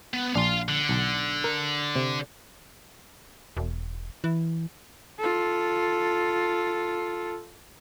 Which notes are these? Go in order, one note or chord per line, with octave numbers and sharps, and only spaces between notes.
B3
A#1 D4 F5 C6
D3
B1
A#4
C3
E1
E3
F4 A4